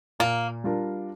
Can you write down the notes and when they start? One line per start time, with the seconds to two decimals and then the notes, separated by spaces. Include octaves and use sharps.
0.20 A#2 A#3
0.64 G3 D4 F4 A#4